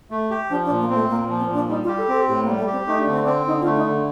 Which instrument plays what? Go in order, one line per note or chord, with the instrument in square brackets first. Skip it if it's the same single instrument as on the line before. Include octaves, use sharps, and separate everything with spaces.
[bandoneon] A3
G4
[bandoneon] F3 [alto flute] D4
[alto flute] D4
[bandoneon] A#2
[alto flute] A#3
[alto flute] A3 [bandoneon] C4
[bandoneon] A#2 [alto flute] A#3
[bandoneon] F3
[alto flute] C4
[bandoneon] A#2 [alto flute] D4
[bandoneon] G3 [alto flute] D#4
[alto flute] F4
[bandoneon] G4
[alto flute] A4
[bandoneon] C4 [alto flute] A4
[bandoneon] A2 [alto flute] G4
[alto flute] A#3
[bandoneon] G3
[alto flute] A3
[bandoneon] G4
[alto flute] C4
[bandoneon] A3 [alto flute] D#4
[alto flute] D4
[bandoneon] D3 [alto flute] C4
[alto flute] D4
[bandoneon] C4
[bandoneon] D3 [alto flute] D#4
[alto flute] F4
[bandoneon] A3
[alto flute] D#4
[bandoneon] D3